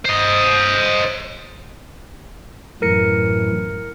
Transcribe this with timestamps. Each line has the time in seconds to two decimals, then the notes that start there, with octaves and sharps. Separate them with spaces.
0.05 C5 D#5
2.82 F#2 A2 E3 A#4 A#6 C#7